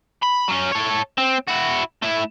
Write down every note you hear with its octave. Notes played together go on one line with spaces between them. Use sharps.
B5
F#3 C#4
A4 C#5
C4
E4 F#4
A3 E4